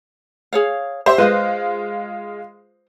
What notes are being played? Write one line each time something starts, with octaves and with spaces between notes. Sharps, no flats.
G#4 C#5 F5
G4 C5 E5
G#3 F4 B4 C5 D#5